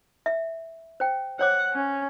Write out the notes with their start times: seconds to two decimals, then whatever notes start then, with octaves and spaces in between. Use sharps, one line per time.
0.26 E5
1.00 C5 G5
1.39 C5 C#5 F#5 D6
1.73 C#4